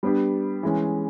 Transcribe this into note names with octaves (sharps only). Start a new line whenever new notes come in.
G3 B3 D4 G4
E3 G#3 C#4